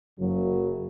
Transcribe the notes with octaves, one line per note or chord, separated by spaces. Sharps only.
F#1 F#2 C#3 F#3